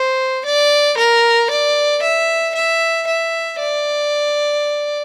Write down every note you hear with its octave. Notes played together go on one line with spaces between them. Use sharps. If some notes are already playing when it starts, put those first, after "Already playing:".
Already playing: C5
D5
A#4
D5
E5
E5
E5
D5